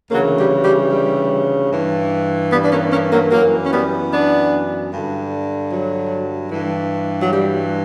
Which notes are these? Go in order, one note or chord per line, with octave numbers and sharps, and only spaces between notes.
D2 C#3 E3 F#3 A#3
G3
G3
G3
G2 E3
G3 B3
D4
A#3 C#4
A#3 C#4
F#3 A#3
F#2 E3 F#3 A#3
C#4
G3 B3
B3 D4
G2 D3
F#3
G2 E3
F#3
G3